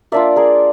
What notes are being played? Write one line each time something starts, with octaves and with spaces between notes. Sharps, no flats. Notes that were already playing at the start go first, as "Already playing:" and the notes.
A#3 D4 F4 D5 E5
G#4 A#4